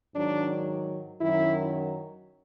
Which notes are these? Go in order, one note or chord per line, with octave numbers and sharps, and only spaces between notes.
G#2 D#3 F#3 D4
F#2 D#3 F#3 E4